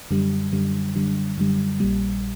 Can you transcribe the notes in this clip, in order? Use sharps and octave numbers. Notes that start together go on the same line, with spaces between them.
F#2 D3 G3
F#2 D3 G3
F#2 D3 G3
F#2 D3 G3
A#1 A#2 G3